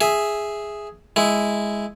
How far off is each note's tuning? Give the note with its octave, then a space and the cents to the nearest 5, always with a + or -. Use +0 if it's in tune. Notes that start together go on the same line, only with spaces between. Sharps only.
G#4 +0 E5 +0
G#3 +0 E4 +0